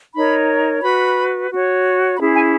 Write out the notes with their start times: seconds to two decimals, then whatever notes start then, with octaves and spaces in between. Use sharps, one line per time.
0.14 D#4 A#4 C#5 B5
0.82 F#4 B4 B5
1.50 F#4 C#5
2.18 C#4 E4 G#4 B5
2.35 G#5